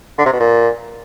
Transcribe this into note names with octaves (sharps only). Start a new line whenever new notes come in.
D3
C3
B2
A#2